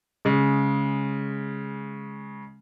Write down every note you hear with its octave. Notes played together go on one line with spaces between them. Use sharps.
C#3 G#3